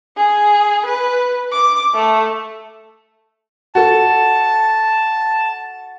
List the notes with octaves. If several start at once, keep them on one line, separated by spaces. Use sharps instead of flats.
G#4
B4
D6
A3
F#4 A4 A5